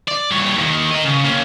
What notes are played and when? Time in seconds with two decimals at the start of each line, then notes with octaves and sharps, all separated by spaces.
0.08 D5
0.31 G2 C#5
0.56 D#2 D#3
0.91 A#4 D#5
1.04 C#3
1.24 A#3 C#4